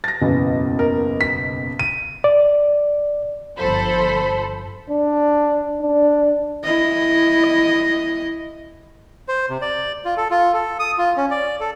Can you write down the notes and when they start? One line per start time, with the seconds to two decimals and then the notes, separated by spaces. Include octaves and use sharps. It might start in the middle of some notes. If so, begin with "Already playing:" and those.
0.04 A6 A#6
0.21 F#1 B1 E2
0.79 A#4
1.21 B6
1.79 D#7
2.24 D5
3.58 G1 F3 A4 C5 B5
4.90 D4
5.82 D4
6.64 E4 D#5
9.28 C5
9.49 C3
9.62 D5
10.05 F4
10.17 A4
10.31 F4
10.54 A4
10.79 D#6
10.98 F4
11.17 C#4
11.31 D5
11.60 A4